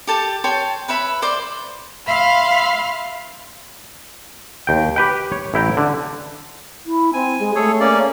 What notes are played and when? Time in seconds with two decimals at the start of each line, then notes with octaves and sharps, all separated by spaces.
0.07 G4 A4 A5
0.44 C#5 G5 A5 C6
0.88 B4 C#5 E5 B5
1.22 C5 D5 C6 D6
2.07 E5 F5 B5 C6 F6
4.67 D#2 G5
4.96 G4 B4 G5
5.32 C#5
5.54 A1 E4 G5 A#5
5.77 D3
6.86 E4
7.13 C4 G#5
7.39 G#3
7.55 A3 G#4 A4 C#5
7.80 A#3 C#4 D5